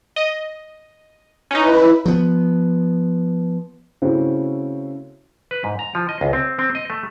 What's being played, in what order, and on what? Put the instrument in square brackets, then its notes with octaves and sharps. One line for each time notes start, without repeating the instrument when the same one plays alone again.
[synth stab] D#5
[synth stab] C#4 D#4 [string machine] E4 B4
[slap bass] F3 B3
[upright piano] C#3 A3 C4 C#4 E4 F#4
[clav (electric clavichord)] B4
G#2
A#5
F3
D#5
C#2
C4
C4
D#5
A3